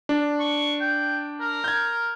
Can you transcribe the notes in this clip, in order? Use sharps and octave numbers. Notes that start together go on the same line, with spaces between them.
D4
C#6
G5
A#4
G6 G#6